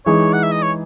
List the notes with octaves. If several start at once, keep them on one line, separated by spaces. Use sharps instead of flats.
E3 G#3 D#4 G#4 C#5
F#5
E5
D#5
C#5